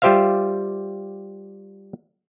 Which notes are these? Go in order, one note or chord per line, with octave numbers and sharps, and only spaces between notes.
G3 F4 G4 C5 E5 F5